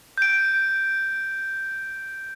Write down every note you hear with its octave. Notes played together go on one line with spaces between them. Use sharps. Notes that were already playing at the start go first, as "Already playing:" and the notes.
G6 D7